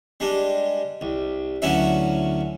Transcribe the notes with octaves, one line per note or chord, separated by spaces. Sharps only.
G3 G#3 D4
C2
D2 F#3 B3 C#4 E4 E5